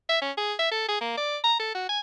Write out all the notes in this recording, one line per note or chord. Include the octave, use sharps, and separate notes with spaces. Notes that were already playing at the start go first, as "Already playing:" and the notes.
E5
C#4
G#4
E5
A4
G#4
A#3
D5
A#5
A4
F#4
G#5